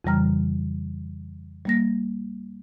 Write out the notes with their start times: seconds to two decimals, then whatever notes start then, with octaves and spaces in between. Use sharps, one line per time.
0.05 F2 C#3 E3 G3 A#5 F6
1.65 G3 A#3 A#6